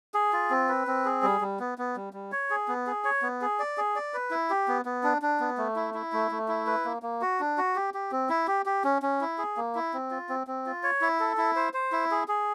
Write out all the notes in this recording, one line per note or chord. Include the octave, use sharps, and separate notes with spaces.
G#4
F4
C4
B4
C4
G#4
G3
G3
B3
B3
G3
G3
C#5
G#4
B3
G#4
C#5
B3
G#4
D5
G#4
D5
B4
E4
G4
B3
B3
D4
D4
B3
A3
E4
E4
A3
A3
E4
B4
A#3
A#3
F#4
D4
F#4
G4
G4
C4
E4
G4
G4
C#4
C#4
E4
G#4
A#3
E4
C4
F4
C4
C4
F4
C#5
E4
A4
E4
C5
C5
E4
G#4
G#4